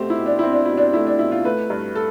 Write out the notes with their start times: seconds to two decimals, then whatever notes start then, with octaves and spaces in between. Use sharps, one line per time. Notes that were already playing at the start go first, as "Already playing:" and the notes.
Already playing: B2 A3 C4 G4 C5
0.10 E4
0.18 B2
0.26 D4
0.39 C4 E4
0.52 D4
0.65 B2 E4
0.77 D4
0.94 A3 E4
1.07 D4
1.19 B2 E4
1.32 F4
1.44 A3 B4
1.70 G2
1.96 A4